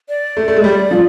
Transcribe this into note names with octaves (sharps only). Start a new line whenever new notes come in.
D5
A3
A3
G#3
G3
F3